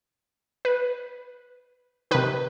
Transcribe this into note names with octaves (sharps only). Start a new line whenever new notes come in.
B4
C3 D#3 B4